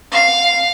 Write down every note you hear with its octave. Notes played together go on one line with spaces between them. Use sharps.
F5